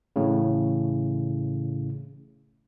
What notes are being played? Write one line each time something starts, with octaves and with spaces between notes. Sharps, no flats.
A1 A2 C#3